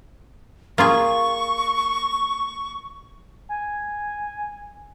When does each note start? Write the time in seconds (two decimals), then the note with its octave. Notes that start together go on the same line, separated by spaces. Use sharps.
0.78 A#3 F4 G#4 C#6
3.49 G#5